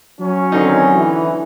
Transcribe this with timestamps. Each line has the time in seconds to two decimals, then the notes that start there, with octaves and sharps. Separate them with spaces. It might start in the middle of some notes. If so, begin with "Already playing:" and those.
0.20 F#3 C#4
0.52 B2 D3 D#3 C4 D#4
0.94 E3